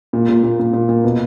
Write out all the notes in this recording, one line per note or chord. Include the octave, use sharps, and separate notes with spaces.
A#2
A#2
A#2
A#2
A#2
A#2
B2